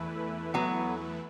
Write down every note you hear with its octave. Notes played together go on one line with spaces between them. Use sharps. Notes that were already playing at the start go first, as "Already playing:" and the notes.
Already playing: E2 E3 A3 E4 B4
F#3 B3